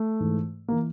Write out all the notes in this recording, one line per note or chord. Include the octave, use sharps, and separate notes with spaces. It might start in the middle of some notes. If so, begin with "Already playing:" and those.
Already playing: A3
G#2 E3
E3 A#3